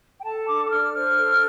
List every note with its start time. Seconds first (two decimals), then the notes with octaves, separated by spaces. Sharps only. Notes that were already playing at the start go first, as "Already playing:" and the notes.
0.19 G5
0.24 A4 A5
0.47 D4 D6
0.66 D6
0.70 D4 F6
0.93 C5 F6
1.16 A4